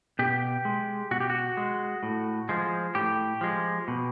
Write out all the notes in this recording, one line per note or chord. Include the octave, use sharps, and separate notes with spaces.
B2 G4
G#3
B2 F#4
G4
F#4
G#3
A2
F3 G#3
A2 G4
F3 G#3
B2